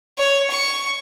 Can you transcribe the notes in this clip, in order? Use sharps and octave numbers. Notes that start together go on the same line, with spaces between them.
C#5
C#6